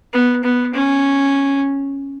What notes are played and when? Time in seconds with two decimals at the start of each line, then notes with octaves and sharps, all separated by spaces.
0.13 B3
0.44 B3
0.74 C#4